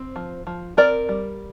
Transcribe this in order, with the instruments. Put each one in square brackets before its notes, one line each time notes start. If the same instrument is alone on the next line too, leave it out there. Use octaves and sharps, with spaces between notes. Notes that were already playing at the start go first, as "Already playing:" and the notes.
Already playing: [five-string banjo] C4
F3
F3
C4 A#4 D5
G3